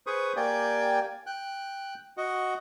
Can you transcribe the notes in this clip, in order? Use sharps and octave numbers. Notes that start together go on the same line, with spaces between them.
G#4 B4 C5 C#6 D#6
A#3 G4 D5 G5 G#5
G5 F#6
F#4 D#5 F#5